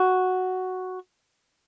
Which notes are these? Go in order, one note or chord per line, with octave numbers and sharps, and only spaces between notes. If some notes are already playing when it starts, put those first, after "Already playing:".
Already playing: F#4